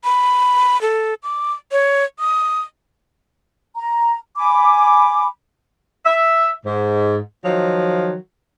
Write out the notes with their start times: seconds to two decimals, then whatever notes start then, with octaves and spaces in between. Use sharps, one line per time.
0.04 B5
0.82 A4
1.23 D6
1.72 C#5
2.19 D#6
3.77 A#5
4.36 G#5 B5 D6
6.05 E5
6.66 G#2
7.45 D#3 F3 F#3